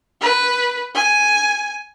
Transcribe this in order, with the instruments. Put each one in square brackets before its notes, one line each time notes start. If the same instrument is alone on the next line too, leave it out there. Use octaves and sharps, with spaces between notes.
[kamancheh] B4
G#5